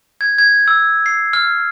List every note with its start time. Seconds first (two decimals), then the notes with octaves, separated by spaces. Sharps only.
0.21 G#6
0.38 G#6
0.68 E6
1.06 C7
1.33 F6